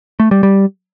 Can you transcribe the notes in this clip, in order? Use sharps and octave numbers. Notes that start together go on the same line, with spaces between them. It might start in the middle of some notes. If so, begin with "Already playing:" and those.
A3
G3
G3